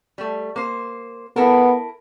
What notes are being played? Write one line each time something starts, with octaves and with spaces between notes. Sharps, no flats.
G3 A3
A#3 C5
B3 E4 A4 A#4